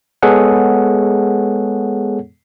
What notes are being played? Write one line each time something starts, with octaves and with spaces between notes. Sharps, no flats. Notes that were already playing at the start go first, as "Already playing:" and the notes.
G#3 B3 G#4 A4 C#5 F#5